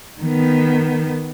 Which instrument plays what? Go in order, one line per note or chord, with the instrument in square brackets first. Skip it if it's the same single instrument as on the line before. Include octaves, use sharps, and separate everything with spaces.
[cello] D#3 B3